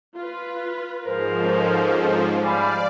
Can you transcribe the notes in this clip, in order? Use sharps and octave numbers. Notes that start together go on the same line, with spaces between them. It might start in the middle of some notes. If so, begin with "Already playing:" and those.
F4 B4
G#2 F3 G#4 A#4 C5
C#4 A4
G3 D5 F5 G#5 B5